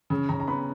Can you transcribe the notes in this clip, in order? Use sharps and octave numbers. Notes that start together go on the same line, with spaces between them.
C#3
C#3 A#5
A#5
B3 B5